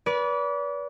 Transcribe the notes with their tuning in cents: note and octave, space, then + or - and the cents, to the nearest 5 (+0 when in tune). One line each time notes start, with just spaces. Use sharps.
B4 -25 D5 -35